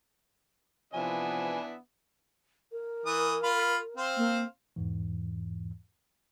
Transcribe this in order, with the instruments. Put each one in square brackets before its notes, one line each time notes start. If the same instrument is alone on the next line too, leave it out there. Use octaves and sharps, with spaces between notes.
[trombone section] C3 F3 [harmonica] E3 D4 E5 [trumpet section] B3 [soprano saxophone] G#5
[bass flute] A#4
[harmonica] E3 D#6
F4 F5 B5
C4 C5 F5
[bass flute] A#3
[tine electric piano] E2 G#2 E3